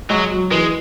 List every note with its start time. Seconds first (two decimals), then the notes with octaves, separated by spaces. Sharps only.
0.10 F#3 G#3
0.32 F#3
0.51 E3 G#3